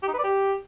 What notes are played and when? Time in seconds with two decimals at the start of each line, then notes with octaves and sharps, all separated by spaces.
0.03 G4
0.08 D#4
0.13 B4
0.19 D5
0.24 G4